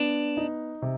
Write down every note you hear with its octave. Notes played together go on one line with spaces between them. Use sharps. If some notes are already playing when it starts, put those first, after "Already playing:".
Already playing: B3 D4
D#4
C3